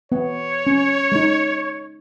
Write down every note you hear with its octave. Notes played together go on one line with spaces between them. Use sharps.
B3 C#5
C#4
G#3 D#4